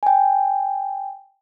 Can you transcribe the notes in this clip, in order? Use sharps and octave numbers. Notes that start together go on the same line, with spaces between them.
G5 G#5